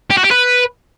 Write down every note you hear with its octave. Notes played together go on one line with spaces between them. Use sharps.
G4
F#4
G4
B4